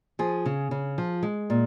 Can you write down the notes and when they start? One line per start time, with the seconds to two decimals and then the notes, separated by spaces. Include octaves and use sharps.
0.19 F3 G#4
0.46 C#3
0.71 C#3
0.98 F3
1.23 G#3
1.50 A#2